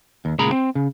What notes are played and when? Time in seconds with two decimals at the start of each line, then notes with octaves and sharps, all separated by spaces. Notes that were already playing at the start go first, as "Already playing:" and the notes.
0.25 D#2
0.39 C#2 A#2 G#4 A#5 B5
0.52 C4
0.75 C#3